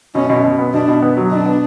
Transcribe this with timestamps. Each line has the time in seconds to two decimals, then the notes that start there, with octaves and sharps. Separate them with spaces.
0.15 B2 C#4
0.30 B2
0.44 B2
0.59 B3
0.73 B2 D4
0.88 B2
1.02 B3
1.17 F#3
1.31 B2 D4
1.46 B3